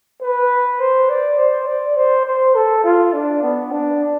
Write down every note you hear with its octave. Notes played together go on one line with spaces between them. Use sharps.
B4
C5
D5
C5
D5
C5
C5
A4
F4
D4
B3
D4